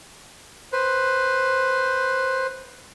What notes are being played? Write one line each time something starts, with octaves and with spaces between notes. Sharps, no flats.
B4 C5